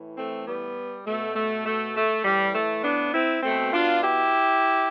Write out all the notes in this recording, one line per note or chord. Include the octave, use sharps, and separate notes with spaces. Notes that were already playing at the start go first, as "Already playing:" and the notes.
Already playing: A2 E3
A3 C4
G3 B3
B2 A3
A3
A3
A3
A2 E3 G3
A3
B3 D4
C4 E4
B2 A3 C4
D4 F4
E4 G4